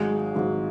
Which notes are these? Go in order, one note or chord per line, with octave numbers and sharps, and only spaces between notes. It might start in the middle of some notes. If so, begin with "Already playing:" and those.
Already playing: G#1 G#2 F#3 G#3
G#1 G#2 F#3